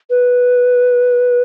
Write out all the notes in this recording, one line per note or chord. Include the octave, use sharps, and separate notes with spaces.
B4